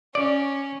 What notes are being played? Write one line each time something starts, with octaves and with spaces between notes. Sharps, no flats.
C#4 D5